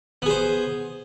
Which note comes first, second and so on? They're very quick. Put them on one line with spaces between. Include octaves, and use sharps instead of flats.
B3 G#4 C5